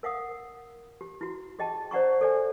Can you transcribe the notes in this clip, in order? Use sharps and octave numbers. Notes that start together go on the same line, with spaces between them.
A#4 F5 F#5 D#6
G4
E4 F#4
G4 G#4 D#5 G5 A5
C5 D5 F#5 A#5 C#6
A4 D5 G#5